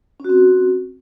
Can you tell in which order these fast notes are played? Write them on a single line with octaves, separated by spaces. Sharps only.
C#4 F#4 C4